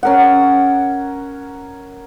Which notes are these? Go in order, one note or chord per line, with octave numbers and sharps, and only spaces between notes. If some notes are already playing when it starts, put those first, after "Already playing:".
C#4 A#4 F#5